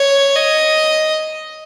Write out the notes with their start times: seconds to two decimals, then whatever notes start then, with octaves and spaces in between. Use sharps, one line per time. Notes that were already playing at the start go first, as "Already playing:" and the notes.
Already playing: C#5
0.36 D#5